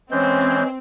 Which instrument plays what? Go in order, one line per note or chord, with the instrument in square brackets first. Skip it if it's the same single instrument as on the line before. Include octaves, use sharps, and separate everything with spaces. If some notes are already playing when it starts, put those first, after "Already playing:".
[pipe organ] E3 G#3 G6 [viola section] C4 [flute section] C#4